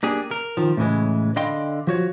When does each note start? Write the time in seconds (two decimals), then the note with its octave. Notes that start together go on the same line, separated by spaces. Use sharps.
0.03 A#3 D4 G4 G#4
0.31 A#4
0.57 D#3 F3
0.77 A2 C#3 E3 G#3
1.36 D3 D#5 F5 G5 B5 C6
1.87 F3 F#4 C#5